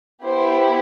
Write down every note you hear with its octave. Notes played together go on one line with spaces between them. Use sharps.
B3 E4 G4 C5